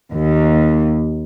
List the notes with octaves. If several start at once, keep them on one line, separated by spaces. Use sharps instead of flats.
D#2